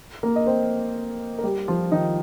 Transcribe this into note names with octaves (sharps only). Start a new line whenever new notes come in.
A#3 A#4
D#5
C4 C5
A#4
G3 G4
F3 F4
D#3 D#4